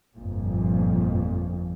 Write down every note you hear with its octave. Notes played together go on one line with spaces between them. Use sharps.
G1 F2 A#2